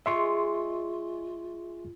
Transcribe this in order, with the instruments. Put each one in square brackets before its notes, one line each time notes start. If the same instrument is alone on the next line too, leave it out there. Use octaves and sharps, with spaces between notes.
[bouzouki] G#3 G#4 D#5 [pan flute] F4 [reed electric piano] E5 C6 C#6